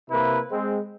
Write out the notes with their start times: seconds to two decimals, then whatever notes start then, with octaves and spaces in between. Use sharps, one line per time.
0.10 C3 A#3 E4 B4
0.50 G#3 C4